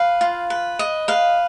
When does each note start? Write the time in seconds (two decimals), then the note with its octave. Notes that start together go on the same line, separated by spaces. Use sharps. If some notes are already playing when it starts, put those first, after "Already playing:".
Already playing: B4 F5
0.21 F4
0.50 B4
0.79 D#5
1.08 B4 F5